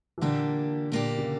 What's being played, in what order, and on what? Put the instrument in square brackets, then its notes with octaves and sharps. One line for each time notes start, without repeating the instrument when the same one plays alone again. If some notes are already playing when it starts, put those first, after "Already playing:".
[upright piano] E3
[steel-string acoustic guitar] A#2 A#3 D4 G4 [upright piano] D3
[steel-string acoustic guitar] A#2 A#3 D4 G4
[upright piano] C#3